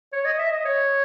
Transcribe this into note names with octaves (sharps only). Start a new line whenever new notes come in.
C#5
D#5
E5
D#5
C#5